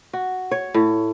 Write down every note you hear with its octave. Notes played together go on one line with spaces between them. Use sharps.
F#4
C#5
A2